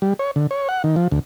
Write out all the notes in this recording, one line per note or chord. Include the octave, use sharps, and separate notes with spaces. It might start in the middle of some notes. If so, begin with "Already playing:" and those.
G3
C#5
D3
C#5
F#5
D#3
F3
D2